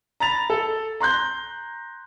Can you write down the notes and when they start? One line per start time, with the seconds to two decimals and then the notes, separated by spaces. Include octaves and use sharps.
0.20 A#5 B5 A6 F7
0.50 A4
1.00 A#5 C6 F#6 G6